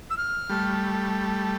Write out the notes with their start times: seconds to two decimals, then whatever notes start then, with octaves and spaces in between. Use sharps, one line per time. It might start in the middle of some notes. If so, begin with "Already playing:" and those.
0.10 E6
0.17 F6
0.49 G3 A3